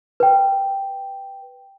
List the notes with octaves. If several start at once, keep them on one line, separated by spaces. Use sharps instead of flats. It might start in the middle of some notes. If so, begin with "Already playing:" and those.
B4 G5